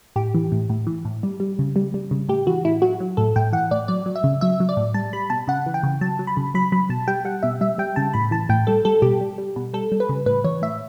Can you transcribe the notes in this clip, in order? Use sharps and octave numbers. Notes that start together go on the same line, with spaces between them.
A2 G4
E3
A2
A2
E3
A2
G3
G3
C#3
G3
G3
C#3
A2 G4
E3 F#4
A2 E4
F#3 F#4
F#3
A2 A4
A2 G5
E3 F#5
A2 D5
F#3 D5
F#3
E5
C#3
F#3 E5
F#3
D5
A2
G3 A5
G3 B5
B2 A5
C#3 F#5
E3
G5
C#3
F#3 A5
F#3
B5
C#3
F#3 B5
F#3 B5
B2 A5
G3 G5
G3 F#5
B2 E5
G3 E5
G3 G5
C#3 A5
A2 B5
E3 A5
A2 G5
G3 A4
G3 A4
B2 G4
G3
G3
B2
G3 A4
G3
B4
C#3
A2 B4
E3 C#5
A2 E5